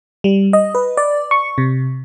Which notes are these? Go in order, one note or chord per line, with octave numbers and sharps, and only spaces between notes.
G3
D#5
B4
D5
C#6
C3